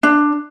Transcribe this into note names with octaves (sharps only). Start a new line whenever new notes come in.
D4